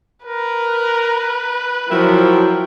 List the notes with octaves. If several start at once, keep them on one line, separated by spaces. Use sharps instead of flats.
A#4 B4
F3 F#3 E4 F#4 A#4 G5